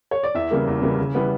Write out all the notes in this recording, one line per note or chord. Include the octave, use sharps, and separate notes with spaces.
C#5
D5
E2 E5
C#3 E3 G3 A#3
E2
C#3 E3 G3 A#3
C#3
E3 G3 B3